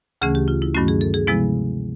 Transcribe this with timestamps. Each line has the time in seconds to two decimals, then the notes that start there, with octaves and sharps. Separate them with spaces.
0.22 D2 C#3 E3 A3 C#4 G#4
0.35 G4
0.48 F4
0.62 E4
0.74 G2 D#3 F#3 A3 C#4 F#4
0.88 G#4
1.01 A4
1.14 G#4
1.27 C3 F3 G#3 B3 E4